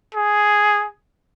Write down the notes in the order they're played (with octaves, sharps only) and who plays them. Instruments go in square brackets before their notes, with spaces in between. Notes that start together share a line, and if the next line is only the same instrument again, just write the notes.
[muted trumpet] G#4